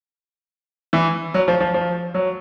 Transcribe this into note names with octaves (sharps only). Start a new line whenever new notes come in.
E3
F#3
F3
F3
F3
F#3